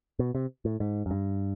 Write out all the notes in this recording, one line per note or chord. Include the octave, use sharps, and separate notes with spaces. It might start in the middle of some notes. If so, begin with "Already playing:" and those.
B2
C3
A2
G#2
F#2
G2